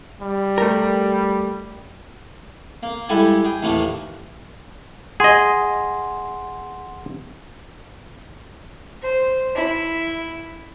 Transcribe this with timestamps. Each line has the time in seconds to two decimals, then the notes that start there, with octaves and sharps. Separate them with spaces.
0.22 G3
0.58 A3 G4 A#4
2.83 A#3
3.09 G3 G#3 E4 G4 A4 G#5
3.45 G#4 G5
3.62 D#2 A2 E3 A3 A#3
5.20 G#4 D#5 F#5 C6
9.01 C5
9.56 E4